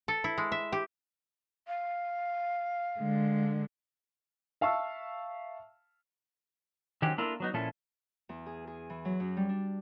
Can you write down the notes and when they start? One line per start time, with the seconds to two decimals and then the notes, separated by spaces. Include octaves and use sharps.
0.08 A4
0.24 E4
0.38 G#3
0.52 E5
0.72 G4
1.67 F5
3.00 D3 G#3
4.61 E5 F5 A5 C#6 E6
7.02 D#3 F#3 C#4 G4 C5
7.18 A#3 D4 E4 F4 A4 A#4
7.40 F#3 B3 D#4
7.54 A#2 F3 C#4 E4 A4
8.29 E2
8.46 G#4
8.67 G#4
8.90 E3
9.05 F#3
9.20 F#2
9.37 G3
9.49 D4